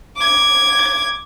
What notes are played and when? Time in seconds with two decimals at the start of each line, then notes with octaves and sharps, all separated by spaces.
0.16 D6 G#6